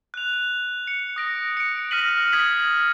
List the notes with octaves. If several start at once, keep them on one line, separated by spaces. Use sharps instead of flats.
F#6 F7
C#7
D#6 A#6 D7
C#7 D7
F6 A#6 B6 D#7 F#7
D#6 G#6 B6 F#7